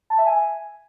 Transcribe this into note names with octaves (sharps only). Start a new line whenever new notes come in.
A5
E5
G#5